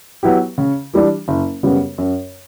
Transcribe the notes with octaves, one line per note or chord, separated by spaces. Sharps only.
F#3 B3 E4 G4
C#3
E3 G3 D4
F#1
F#2 C#3 G3 B3
F#2